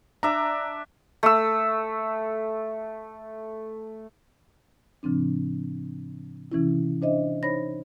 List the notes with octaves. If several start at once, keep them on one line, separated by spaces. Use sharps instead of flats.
D4 E5 A#5
A3 E6
A2 C#3 F3 C4 D4
C3 E3 C#4 E4
D4 C5 D#5 E5
D#4 C5 C#5 B5 A#6